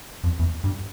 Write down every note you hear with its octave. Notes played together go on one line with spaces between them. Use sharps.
F2
E2
G2